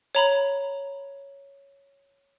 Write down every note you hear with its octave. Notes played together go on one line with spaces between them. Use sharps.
C#5 A#5 B5